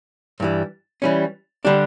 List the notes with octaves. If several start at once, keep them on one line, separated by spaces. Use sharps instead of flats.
G2 E3 G3
E3 G3 C#4
D3 G3 D4 G4